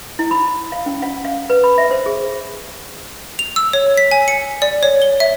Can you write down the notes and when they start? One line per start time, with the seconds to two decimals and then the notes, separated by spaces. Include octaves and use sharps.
0.19 E4
0.31 B5
0.72 F5
0.86 C#4
1.02 F#5
1.25 F5
1.50 B4
1.64 B5
1.78 E5
1.91 C5
2.06 G#4
3.39 F7
3.56 E6
3.73 C#5
3.97 B6
4.11 G#5
4.28 C#7
4.62 D5
4.83 C#5
5.02 G7
5.20 E5